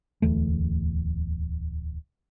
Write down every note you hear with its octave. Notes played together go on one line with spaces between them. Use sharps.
D1 E2 A3